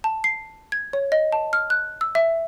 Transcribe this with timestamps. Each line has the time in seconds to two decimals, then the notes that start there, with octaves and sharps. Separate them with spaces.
0.04 A5
0.24 C7
0.72 G#6
0.93 C#5
1.12 D#5
1.32 A5
1.53 F6
1.70 F#6
2.01 E6
2.15 E5